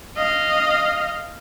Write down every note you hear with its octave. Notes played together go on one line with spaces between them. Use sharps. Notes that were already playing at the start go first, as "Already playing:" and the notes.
D#5 F5